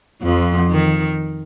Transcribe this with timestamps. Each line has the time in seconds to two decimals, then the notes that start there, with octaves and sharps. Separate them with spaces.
0.22 F2 F3
0.70 D#3